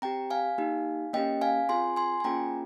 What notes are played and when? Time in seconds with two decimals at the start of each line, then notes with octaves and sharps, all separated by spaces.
0.02 C4 G4 G5 A#5
0.30 F5 G#5
0.58 A#3 D#4 G4
1.13 A#3 C#4 G4 D#5 G5
1.41 F5 G#5
1.69 C4 F4 G#4 G#5 C6
1.96 G#5 C6
2.20 G#5
2.24 A#3 C#4 F4 G#4 G5 A#5